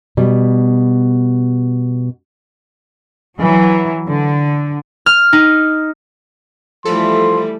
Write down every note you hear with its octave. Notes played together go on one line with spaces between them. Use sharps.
B2 G3
E3 F#3
D3
F6
D#4
E3 F3 G3 A3 A4 C6